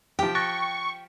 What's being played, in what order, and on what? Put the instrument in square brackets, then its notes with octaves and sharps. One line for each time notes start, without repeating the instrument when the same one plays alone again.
[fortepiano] F3 G4 [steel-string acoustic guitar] G5
[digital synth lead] C#6 [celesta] F#6 A6 A#6